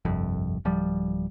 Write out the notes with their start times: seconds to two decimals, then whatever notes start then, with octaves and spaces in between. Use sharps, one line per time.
0.05 G1 C2 F2
0.65 D1 F3 G3